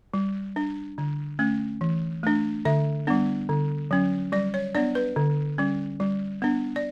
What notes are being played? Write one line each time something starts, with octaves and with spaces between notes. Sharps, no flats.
G3
D4
D3
A3 C#4
E3
A3 D4
D3 E5
G3 B3 D4
D3
F#3 C#4
G3 D5
C#5
B3 D4 D5
B4
D3
G3 C#4
G3
B3 D4
D5